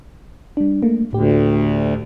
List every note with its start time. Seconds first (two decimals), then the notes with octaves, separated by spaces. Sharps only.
0.57 G3 D4
0.82 A3 A#3
1.13 D2 A2 G4